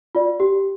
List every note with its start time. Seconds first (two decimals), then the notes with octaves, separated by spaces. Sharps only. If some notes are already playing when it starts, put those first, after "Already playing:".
0.15 F4 D5
0.40 G4